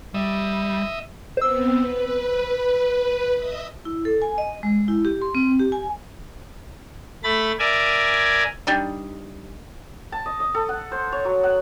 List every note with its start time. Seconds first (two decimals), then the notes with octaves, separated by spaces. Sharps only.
0.14 G3 D#5 E5
1.37 B3 C4 C5 E6
1.76 B4
3.36 D#5 E5 D#6
3.85 E4
4.05 A4
4.22 G#5
4.38 D#5
4.63 G#3
4.88 E4
5.05 G4
5.22 C6
5.35 C4
5.59 G4
5.72 G#5
7.24 A3 B5 A6
7.59 A#4 D5 E5 G#5
8.67 G3 D4 D#4
10.12 A5
10.26 D#5
10.40 D#5
10.55 A4
10.69 F#5
10.92 C5
11.12 C#5
11.25 F#3
11.44 F#5